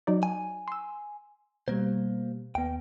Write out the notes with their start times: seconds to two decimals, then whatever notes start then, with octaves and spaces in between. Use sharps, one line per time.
0.07 F#3 D#4 D5
0.23 G#5
0.68 C6 E6
1.68 B2 G3 A#3 C5 G#6
2.55 D#2 B3 G5